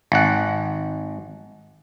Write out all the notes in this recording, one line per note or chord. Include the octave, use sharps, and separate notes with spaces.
G#1 F#5